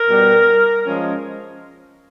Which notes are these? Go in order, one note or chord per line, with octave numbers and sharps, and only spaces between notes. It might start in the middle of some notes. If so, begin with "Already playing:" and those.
Already playing: A#4
B2 G3 B3
F3 G#3 C#4